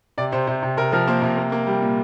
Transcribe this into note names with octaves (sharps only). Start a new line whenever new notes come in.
C3 D5
C3 C5
C3 C5
C3
C3 A#4
F3 A#4
A#3 C5
C3
A#3
A#3
G3
A#2